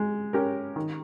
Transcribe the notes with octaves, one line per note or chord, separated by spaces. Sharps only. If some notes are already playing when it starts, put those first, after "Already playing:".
Already playing: G#3
C#4 G4 A#4
D#3